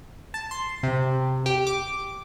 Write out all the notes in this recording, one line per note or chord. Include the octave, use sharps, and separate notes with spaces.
A5
C6
C3
G4
D6